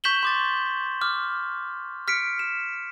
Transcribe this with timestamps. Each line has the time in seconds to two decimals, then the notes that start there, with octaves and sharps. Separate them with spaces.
0.04 C#6 G6 B6 E7 F#7 G7
0.23 C6 D6 A6
1.01 D6 F6
2.08 F6 B6 C#7 D7
2.39 E7